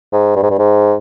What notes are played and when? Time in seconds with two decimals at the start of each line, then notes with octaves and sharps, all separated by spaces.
0.12 G#2
0.36 G2
0.43 G#2
0.50 G2
0.58 G#2